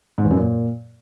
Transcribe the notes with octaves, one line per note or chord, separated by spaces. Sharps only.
G#2
E2
F#2
A#2